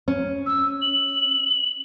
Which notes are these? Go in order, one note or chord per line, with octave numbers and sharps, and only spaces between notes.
C#4
E6
F#7